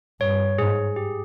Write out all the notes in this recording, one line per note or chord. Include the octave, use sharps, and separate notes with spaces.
G2 C#5
G#2 G#4
G4